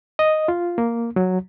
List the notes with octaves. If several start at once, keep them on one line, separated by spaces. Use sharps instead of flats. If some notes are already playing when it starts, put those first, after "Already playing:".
D#5
F4
A#3
F#3